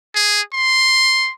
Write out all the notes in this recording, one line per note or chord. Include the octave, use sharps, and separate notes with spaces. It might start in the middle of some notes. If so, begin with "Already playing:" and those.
G#4
C6